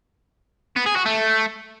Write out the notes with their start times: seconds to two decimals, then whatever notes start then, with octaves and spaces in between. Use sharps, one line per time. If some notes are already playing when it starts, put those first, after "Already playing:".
0.76 B3
0.86 G#4
0.96 F#4
1.05 A3